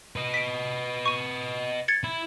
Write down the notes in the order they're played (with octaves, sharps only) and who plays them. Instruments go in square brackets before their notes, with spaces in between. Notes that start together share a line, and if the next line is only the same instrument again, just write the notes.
[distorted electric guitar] B4 D#5
[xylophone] B6 D7
C#6 D#7
G#6 A6 C#7
[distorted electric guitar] E4